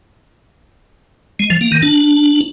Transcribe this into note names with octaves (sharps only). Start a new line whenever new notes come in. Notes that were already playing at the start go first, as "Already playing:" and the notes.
G#3
F3
A#3
D#3
D4